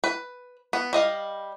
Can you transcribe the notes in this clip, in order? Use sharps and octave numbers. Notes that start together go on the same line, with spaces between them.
B4
B3
G3 D#5 F5